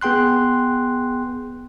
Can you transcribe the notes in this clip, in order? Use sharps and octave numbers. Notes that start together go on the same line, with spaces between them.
B3 G#4 G5 C6 F#6